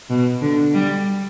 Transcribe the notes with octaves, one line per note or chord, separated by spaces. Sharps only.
B2
D3
G3